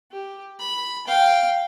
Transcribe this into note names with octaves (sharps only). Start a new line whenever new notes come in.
G4
B5
F5 G5